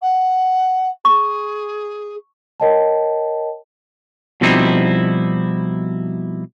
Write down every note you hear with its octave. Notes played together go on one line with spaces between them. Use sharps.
F#5
G#4 C#6
A#4 C#5 D#5 G5 A5
B2 F3 G3 C4 D#4 E4